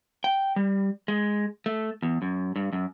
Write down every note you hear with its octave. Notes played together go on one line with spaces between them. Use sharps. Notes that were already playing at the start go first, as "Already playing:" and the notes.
G5
G3
G#3
A3
E2
F#2
G2
F#2